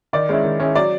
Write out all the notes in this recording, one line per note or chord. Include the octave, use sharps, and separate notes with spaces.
D#3 D5
G#3 C#4 E4
D#3
G#3 C#4 E4
F#3 D5